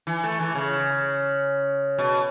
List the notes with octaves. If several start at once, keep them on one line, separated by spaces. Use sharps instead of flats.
E3
A3
E3
C#3
B2